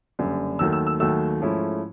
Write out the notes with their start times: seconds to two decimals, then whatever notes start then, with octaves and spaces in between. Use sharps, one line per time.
0.19 F#1 F#2 D3 G3
0.59 D#2 D#3 F#3 A3 E6
0.73 E6
0.87 E6
1.00 D#2 D#3 F#3 A3 E6
1.41 G#2 F3 A3 C#4 E4